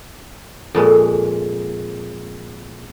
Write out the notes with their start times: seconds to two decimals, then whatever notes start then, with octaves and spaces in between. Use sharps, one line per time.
0.75 F2 A#2 G#3